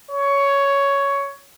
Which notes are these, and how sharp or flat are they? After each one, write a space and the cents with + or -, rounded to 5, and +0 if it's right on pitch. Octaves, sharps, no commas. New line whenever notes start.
C#5 +10